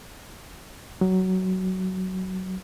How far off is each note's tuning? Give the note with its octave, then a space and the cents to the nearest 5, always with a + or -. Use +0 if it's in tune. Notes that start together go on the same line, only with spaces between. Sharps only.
F#3 +15